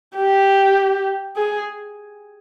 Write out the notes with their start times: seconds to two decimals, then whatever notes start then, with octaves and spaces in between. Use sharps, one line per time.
0.16 G4
1.36 G#4